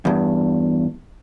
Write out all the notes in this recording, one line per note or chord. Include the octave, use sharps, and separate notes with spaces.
E2 G2